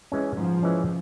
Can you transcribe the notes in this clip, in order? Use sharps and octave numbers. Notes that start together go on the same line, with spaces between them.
E3 G#3 C#4
G#2 F3
E3 G#3 C#4